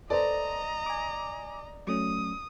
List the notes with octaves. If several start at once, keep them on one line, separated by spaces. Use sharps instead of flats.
A4 B4 C5 D5 D#5 A#5
G#5 D6
F#3 A3 C#4 D#6